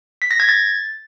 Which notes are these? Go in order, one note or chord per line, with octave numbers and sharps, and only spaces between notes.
B6
A#6
G#6
A6